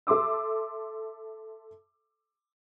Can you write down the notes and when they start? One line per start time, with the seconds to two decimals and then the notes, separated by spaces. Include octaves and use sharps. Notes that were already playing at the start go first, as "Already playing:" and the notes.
0.07 A4 E5 C6 D6 E6